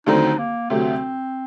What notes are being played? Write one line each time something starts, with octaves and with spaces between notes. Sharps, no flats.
D#2 D3 F#3 A3 C4 D#4
A#3
D2 C3 F#3 A3 C4